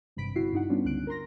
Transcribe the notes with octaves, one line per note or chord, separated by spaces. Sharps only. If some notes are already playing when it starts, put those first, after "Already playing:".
G#1 G2 C3 B5 B6 D7
G1 C4 E4 F#4 C7
G2 D#4 F#5
G3 B3 C#4 D4 F4
C#2 D3 C#4 F#6 D7
A#4 A#5 C6 A#6